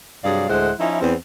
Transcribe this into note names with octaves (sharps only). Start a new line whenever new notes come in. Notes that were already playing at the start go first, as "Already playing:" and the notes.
G2 C3 F#3 G#4 D5 F5
D2 A2 G#3 E4 C5 F#5
F3 C#4 D#4 E4
E2 C4